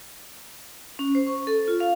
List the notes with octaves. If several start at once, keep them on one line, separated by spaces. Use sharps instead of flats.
C#4
C5
C#6
A4
F4
F5